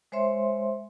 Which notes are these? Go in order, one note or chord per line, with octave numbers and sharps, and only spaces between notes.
G#3 C5 C#5 E5 C6